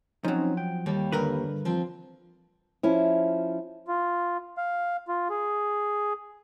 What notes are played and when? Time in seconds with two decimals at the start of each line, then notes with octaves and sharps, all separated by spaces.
0.24 F3 F#3 C4 C#4 D#4
0.57 G5
0.86 D#2 G3 A#3
1.12 G2 D3 A#4 B4
1.65 F3 C4
2.83 F3 C#4 E4
3.88 F4
4.57 F5
5.08 F4
5.30 G#4